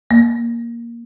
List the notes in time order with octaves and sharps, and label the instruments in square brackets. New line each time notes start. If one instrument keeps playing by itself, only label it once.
[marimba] A#3